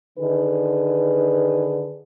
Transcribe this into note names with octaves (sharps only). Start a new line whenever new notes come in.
D3 D#3 D#4 G#4 B4